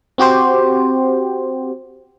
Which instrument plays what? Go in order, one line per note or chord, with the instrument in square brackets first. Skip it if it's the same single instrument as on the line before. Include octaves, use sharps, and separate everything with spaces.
[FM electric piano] C4 F#4 G4 C5